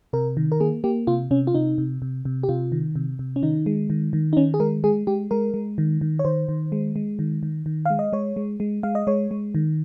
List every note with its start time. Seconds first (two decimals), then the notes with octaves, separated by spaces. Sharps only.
0.13 C3 A#4
0.37 D#3
0.52 A#4
0.60 A#3 G#4
0.84 A#3 G4
1.07 C3 F4
1.31 C3 C#4
1.47 F4
1.54 C3 D#4
1.78 C3
2.02 C3
2.25 C3
2.43 G4
2.49 C3 F4
2.72 D#3
2.96 C3
3.19 C3
3.36 C#4
3.43 D#3 D#4
3.66 G#3
3.90 D#3
4.13 D#3
4.33 D#4
4.37 D#3 C#4
4.54 G#4
4.60 G#3 A#4
4.84 G#3 G#4
5.07 G#3 G4
5.31 G#3 A#4
5.54 G#3
5.78 D#3
6.01 D#3
6.19 C#5
6.25 D#3 C5
6.49 D#3
6.72 G#3
6.96 G#3
7.19 D#3
7.43 D#3
7.66 D#3
7.85 G#3 F5
7.99 D#5
8.13 G#3 C#5
8.36 G#3
8.60 G#3
8.83 G#3 F5
8.95 D#5
9.07 G#3 C#5
9.31 G#3
9.55 D#3